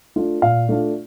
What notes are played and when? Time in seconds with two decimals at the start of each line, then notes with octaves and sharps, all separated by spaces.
0.16 A3 D4 F4
0.42 A#2 F5
0.69 A3 D4 F4